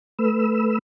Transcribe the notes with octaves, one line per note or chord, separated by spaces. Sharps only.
A3 B4 E6